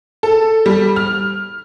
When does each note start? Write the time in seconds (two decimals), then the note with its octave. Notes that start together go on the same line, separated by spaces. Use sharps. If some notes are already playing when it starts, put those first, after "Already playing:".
0.23 A4
0.66 G3
0.96 F6